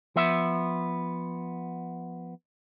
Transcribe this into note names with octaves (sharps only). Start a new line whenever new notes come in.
F3 B3 E5